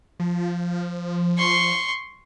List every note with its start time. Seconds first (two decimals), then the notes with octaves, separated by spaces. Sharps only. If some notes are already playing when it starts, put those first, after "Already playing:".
0.20 F3
1.38 C6 C#6